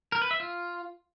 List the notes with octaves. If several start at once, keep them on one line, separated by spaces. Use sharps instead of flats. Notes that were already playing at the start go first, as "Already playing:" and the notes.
A#4
B4
E5
F4